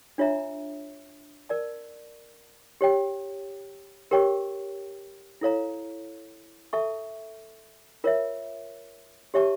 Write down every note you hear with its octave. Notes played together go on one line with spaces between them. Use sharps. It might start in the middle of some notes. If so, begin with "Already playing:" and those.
D4 F4 C#5 E5 A#5
A#4 D5 A5
G4 C#5 G5
G4 A#4 C#5 G5 C#6
E4 A4 C#5 F5 A#5
A4 E5 A5 C#6
F4 A#4 C#5 E5
G4 C#5 E5 A5 C#6